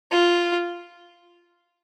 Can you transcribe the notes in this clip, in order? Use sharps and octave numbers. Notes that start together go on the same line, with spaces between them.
F4